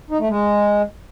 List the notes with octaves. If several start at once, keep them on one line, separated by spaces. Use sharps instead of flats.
D#4
A3
G#3